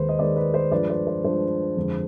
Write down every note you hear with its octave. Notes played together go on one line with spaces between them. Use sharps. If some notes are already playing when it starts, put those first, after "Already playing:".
Already playing: D#2 D#3 G#3 B4 C5
D#5
D#2 D#3 G#3 B4 D5
B4
C5
G2 F3 G#3 B4 D5
C5
C5
G2 F3 G#3 C5
F2 D3 G#3